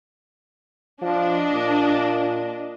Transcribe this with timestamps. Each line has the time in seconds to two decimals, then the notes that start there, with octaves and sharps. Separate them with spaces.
1.02 F3 D4 D#5
1.51 A#2